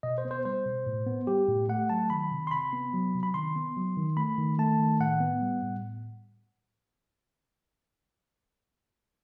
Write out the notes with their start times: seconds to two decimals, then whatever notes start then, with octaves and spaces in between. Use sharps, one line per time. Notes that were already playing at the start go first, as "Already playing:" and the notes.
0.03 B2 D#5
0.18 C5
0.25 B3
0.31 C5
0.45 G3 C5
0.66 B2
0.86 A2
1.07 B3
1.27 G3 G4
1.48 A2
1.69 A3 F#5
1.90 F#3 A5
2.10 D#3 B5
2.32 C3
2.47 C6
2.51 C3 B5
2.73 B3
2.94 F#3
3.15 C3
3.23 B5
3.34 D#3 C6
3.56 B3
3.77 F#3
3.97 D#3
4.17 A3 B5
4.38 D#3
4.58 A3 A5
4.79 D#3
5.00 A2 F#5
5.20 B3
5.41 G3
5.63 A2